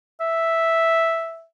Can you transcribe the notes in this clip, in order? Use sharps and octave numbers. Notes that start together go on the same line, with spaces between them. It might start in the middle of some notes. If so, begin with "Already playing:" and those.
E5